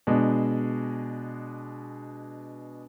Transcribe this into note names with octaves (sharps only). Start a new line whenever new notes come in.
B2 G#3 D4